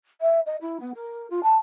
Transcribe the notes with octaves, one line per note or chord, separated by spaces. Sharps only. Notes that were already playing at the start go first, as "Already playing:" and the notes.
E5
D#5
E4
B3
A#4
F4
A5